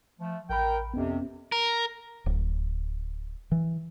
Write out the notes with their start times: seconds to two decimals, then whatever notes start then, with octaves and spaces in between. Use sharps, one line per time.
0.19 F3 A3
0.50 A1 A#4 G5 B5
0.94 F2 C3 B3 C#4
1.52 A#4
2.26 D1
3.52 E3